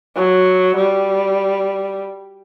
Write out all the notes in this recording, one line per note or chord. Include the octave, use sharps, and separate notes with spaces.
F#3
G3